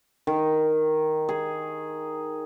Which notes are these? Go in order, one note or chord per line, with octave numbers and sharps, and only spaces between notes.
D#3
G#4